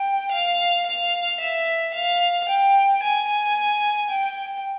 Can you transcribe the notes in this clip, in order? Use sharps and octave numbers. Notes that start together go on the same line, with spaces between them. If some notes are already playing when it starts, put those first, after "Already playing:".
Already playing: G5
F5
F5
E5
F5
G5
G#5
G5